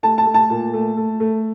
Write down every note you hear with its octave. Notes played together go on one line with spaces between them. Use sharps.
A3 A5
A5
A3
A5
A#2
A3
A3
A3